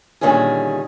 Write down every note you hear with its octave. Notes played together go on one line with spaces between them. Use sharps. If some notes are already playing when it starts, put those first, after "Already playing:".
A#2 D3 D#3 G3 C#4 G#4